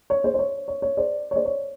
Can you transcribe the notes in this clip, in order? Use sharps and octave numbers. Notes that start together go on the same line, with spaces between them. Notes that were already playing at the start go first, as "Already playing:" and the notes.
C#5
C5
C5
C#5
C#5
C#5
C5 D5
C#5
C5 D5
C#5